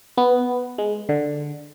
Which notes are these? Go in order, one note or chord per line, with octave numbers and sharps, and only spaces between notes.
B3
G#3
D3